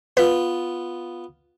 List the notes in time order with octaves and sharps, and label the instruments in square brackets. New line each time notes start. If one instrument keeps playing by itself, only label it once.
[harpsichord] B3 F4 [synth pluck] B4